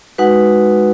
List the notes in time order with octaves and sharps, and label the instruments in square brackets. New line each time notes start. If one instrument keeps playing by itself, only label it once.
[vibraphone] G#3 D#4 F#4 B4 F#5